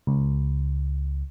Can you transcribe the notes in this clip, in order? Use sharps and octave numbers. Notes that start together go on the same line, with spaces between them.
C#2